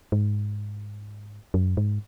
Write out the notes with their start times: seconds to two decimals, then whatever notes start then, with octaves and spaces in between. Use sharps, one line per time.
0.12 G#2
1.54 F#2
1.77 G#2